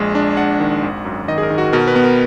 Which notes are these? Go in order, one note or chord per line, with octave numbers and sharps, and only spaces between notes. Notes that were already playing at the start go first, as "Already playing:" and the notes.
Already playing: A#1 G#3
D4
D4 F#5
D#3
G#1
F#2
D#3 D#5
G#4
A#4
D#3
F#4
B2 A#4
B4
B3
A#4